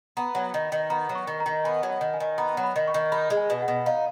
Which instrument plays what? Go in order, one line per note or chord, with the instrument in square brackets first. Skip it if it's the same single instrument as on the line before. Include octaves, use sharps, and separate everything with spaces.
[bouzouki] B3 [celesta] A#5
[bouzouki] F#3
D#3
D#3
[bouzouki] B3 [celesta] A#5
[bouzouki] F#3
[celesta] C#6
[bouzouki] D#3
[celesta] A#5
[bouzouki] D#3
[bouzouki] B3 [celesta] G#5
[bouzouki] F#3
[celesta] F#5
[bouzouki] D#3
[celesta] G#5
[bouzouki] D#3
[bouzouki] B3 [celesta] A#5
[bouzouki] F#3
[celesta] B5
[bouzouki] D#3
[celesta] C#6
[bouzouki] D#3
[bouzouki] D#4 [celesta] B5
[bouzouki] G#3
[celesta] G#5
[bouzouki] B2
[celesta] F#5
[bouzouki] B2
[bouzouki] D#4 [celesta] F5